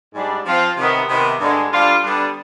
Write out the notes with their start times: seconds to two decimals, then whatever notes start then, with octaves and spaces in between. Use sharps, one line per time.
0.15 G#2 G3 D4
0.45 F3 C4 F4
0.77 C3 D#3 B3
1.09 C3 D#3 B3
1.40 G2 D3 G#3
1.72 D3 G3 D4 F4
2.02 D3 G3 B3 D4